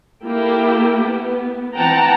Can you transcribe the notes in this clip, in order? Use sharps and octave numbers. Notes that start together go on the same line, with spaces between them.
A#3 E4 G4 A4 G5
B3
E3 C4 F#5 G5 A5 A#5